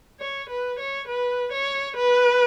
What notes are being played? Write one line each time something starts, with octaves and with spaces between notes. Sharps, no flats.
C#5
B4
C#5
B4
C#5
B4